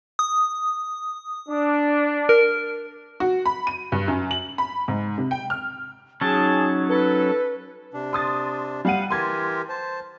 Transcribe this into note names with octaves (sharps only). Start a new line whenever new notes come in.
D#6
D4
A#4
F#4
B5
D#7
G2
F#2
F#7
B5
G#2
C3
G5
F6
F#3 C#4 D#4 G#4 A5
A4 B4
C3 D4
C6 D#6 A6
G3 F5 F#5 D#7
E3 G4 A#4 C6 G#6 A6
C5 A5